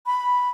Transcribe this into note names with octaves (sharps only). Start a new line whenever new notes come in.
B5